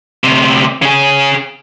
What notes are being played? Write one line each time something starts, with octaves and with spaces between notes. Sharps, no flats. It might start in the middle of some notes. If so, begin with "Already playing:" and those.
D2 C3
C#3 G#4